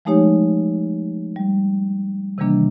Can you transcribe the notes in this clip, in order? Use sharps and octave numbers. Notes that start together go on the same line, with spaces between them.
F3 G#3 A3 D#4 G4 C#5
G3
C3 D#3 E3 G3 A#3 D4